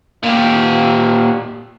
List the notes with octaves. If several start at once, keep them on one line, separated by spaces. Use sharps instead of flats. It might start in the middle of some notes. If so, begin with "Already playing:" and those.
A#2 G4